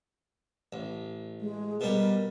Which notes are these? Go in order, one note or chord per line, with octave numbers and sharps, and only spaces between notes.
A1
G#3
B2 G3 A#4